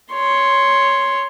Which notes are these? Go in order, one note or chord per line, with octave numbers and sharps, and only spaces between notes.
C#5 C6